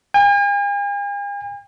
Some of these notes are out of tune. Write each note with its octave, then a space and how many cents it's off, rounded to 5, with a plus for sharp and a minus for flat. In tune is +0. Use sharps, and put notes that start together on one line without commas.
G#5 -45